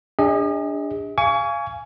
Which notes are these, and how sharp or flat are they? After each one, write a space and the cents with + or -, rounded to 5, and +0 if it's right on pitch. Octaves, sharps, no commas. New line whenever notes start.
D4 -10 G#4 -40 D#5 +35
F5 -20 G#5 +0 C#6 +35